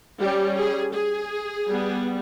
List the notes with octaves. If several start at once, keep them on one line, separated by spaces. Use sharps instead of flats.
G3 C#4 G4
G#4
G#4
G3 B3